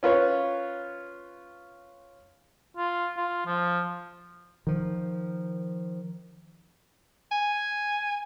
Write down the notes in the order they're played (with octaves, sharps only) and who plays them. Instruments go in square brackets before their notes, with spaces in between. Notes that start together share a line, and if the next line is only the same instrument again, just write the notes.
[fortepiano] C#4 F4 B4 C#5
[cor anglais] F4
F4
F3
[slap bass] D#3 F3
[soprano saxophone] G#5